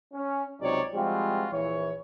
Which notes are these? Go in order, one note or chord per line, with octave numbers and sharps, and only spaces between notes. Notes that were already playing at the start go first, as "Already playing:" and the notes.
C#4
C#2 C3 F#3 D#4 C#5 D5
F3 G3 G#3 C4 F4 F#4
A#1 E3 C#5